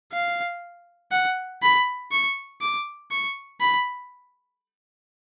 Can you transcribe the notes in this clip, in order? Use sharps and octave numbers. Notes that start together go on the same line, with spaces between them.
F5
F#5
B5
C#6
D6
C#6
B5